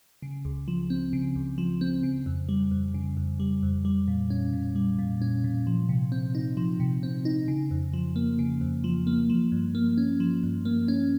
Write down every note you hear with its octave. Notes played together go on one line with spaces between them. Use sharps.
C#3
C#2
F3
C4
C#3
C#2
F3
C4
C#3
F2
G3
F2
C#3
F2
G3
F2
G3
A#2
C#4
A#2
G3
A#2
C#4
A#2
F3
C3
C4
D#4
F3
C3
C4
D#4
C#3
F2
F3
A#3
C#3
F2
F3
A#3
F3
G2
A#3
C#4
F3
G2
A#3
C#4